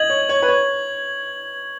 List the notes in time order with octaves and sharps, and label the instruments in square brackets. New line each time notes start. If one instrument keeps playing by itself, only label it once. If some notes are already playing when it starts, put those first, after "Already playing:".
Already playing: [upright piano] D#5 [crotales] G#6 F#7
[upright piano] C#5
C#5
B4
C#5